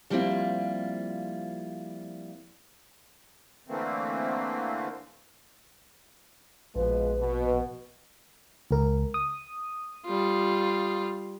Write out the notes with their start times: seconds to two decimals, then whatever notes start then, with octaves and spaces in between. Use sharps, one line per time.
0.10 F3 G3 A#3 C4 E4 F4
3.68 D3 E3 A3 A#3 C4
6.75 A#1 B2 F3 G#3 B4
7.19 B2
8.71 C#2 A#4
9.14 D#6
10.06 G3 F4